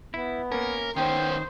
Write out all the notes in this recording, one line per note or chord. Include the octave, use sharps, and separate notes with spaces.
B3 E4
A#3 C#4 A#4
D#3 B3 C#4 C5 G5